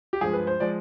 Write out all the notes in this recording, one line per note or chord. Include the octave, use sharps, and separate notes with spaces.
G4
G2 F3 G#3 G#4
B4
C5
F3 G#3 D5